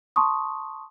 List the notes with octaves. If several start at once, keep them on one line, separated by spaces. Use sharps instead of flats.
A5 C6 C#6 D#6